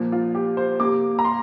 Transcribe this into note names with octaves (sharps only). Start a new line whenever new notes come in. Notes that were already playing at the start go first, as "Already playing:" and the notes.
Already playing: A#2 F3 A#3
F4
G4
C5
C3 A#3 D6
A#5
C6